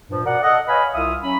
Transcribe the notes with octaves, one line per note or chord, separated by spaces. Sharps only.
G2 A#2 F3
B2 A#4 D5 F#5
A4 D#5 F#5
B4 C#5 D#5 F5 G#5 B5
C2 F4 E5 F5 D#6
F#3 C#4 B5